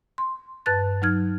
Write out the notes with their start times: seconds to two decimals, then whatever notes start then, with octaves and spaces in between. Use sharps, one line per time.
0.18 C6
0.66 G2 B4 A5 F#6 A6
1.02 F#3 D#4 F6 G#6